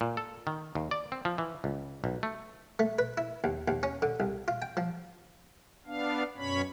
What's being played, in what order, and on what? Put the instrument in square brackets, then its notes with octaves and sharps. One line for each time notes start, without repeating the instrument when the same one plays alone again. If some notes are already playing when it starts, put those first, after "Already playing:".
[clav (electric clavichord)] A#2
A4
D#3
D#2
D5
C4
F3
E3
C#2
B1
A3
[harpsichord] A3
B4
E4
D#2
D#2
C#4
D3
C2
F4
G5
F3
[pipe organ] B3 D4 F5
F#2 B2 C#4 C#5 B5